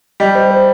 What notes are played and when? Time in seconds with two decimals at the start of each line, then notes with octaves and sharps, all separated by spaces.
0.20 G3 D#5
0.35 C5
0.51 C5